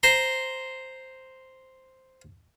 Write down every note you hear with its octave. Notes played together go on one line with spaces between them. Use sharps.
C5 A#5 C6